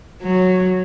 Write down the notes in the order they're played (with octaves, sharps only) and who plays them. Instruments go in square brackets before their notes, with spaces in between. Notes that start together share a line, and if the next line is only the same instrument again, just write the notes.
[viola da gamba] F#3